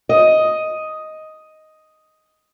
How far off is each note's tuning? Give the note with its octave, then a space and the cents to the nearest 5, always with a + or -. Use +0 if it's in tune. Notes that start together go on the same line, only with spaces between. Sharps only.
D#5 +5